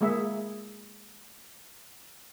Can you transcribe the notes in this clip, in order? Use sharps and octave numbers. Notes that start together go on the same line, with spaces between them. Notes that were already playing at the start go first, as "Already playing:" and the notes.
G#3 A#3 G#4 E5